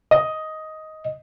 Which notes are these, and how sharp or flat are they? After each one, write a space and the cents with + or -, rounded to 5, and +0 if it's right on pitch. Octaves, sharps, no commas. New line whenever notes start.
D#5 +10